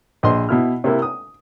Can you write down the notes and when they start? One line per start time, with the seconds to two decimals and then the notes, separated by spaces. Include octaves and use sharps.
0.23 A#1 D#5 C6
0.49 B2 E4 F6
0.84 C3 A#3 E4
1.02 D#6